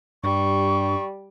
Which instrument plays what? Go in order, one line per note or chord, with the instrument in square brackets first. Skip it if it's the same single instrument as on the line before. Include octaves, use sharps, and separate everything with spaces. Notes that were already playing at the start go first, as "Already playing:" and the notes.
[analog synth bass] G2 [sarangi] G3 [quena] C#6